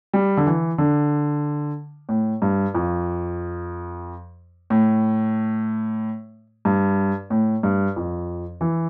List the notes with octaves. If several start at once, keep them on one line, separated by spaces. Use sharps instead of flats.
G3
D3
E3
D3
A2
G2
F2
A2
G2
A2
G2
F2
E3